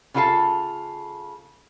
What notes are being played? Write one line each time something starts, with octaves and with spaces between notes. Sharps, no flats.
C#3 B3 F4 A4 F5 A5